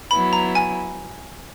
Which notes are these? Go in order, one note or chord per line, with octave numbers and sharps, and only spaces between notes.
F#3 B3 E4 B5
A#5
G#5